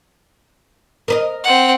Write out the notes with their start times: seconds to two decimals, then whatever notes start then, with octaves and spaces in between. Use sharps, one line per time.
1.08 A#4 B4 D#5
1.44 C4 F#5